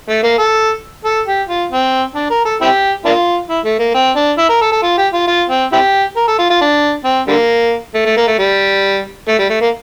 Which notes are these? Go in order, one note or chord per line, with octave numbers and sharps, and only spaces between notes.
A3
A#3
A4
A4
G4
F4
C4
D4
A#4
A4
C4 E4 G4
A#3 D4 F4
E4
A3
A#3
C4
D4
E4
A#4
A4
A4
F4
G4
F4
F4
C4
C4 E4 G4
A#4
A4
F4
F4
D4
C4
D3 G3 A#3
A3
A3
A#3
A3
G3
A3
G3
A3
A#3